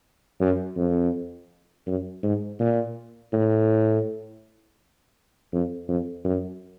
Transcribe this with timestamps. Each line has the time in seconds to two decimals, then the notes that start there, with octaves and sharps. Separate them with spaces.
0.41 F#2
0.76 F2
1.87 F#2
2.23 G#2
2.59 A#2
3.33 A2
5.53 F2
5.88 F2
6.25 F#2